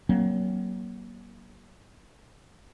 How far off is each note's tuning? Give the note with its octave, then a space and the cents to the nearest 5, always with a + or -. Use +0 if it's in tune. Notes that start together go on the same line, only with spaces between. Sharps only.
F#3 +25 A#3 +25 C#4 -45